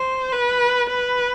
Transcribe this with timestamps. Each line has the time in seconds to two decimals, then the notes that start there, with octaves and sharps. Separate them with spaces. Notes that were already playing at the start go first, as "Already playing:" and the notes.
Already playing: C5
0.33 B4
0.90 B4